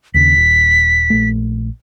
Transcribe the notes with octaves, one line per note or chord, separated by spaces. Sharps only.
D#2 C#3 B6
D#1
A#1 A3